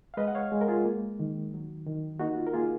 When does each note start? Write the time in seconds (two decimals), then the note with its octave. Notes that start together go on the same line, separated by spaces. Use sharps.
0.14 F5
0.17 G#3 B4 D#5
0.28 F#5
0.35 C#5 F5
0.52 G#3
0.61 A#4
0.68 F4 G#4
0.85 A#3
1.20 D#3
1.53 F#3
1.87 D#3
2.20 A#3 D#4 F#4
2.37 F4
2.47 A#4
2.54 A#3 F4 G#4